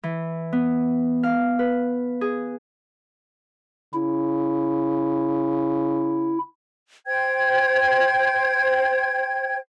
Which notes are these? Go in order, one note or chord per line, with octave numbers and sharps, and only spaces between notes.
E3
B3
F5
B4
G#4
C#3 E4
C5 G5 G#6